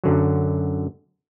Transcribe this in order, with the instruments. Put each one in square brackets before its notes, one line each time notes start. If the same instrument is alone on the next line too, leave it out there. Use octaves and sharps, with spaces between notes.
[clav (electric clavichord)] F#2 D3 F#3